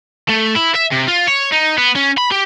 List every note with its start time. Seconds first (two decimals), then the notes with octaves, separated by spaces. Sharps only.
0.30 A3
0.56 E4
0.76 E5
0.92 C3
1.08 F4
1.28 C#5
1.52 D#4
1.78 B3
1.96 C#4
2.18 B5
2.31 G4